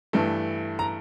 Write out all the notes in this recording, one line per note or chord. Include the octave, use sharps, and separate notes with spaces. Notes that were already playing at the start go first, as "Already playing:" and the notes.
G2 E3 A3
A#5